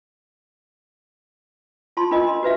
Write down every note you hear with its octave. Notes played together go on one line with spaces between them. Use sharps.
F4 A5 C6
D4 F4 A#4 D#5
C6
F#4 B4 E5 F5